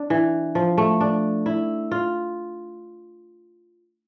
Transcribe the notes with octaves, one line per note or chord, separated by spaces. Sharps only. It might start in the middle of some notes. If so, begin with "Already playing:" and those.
Already playing: D4
E3
F3
A3
D4
E4
F4